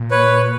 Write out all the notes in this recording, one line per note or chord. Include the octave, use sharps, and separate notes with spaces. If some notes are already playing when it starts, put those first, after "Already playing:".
Already playing: A#2
B4 C#5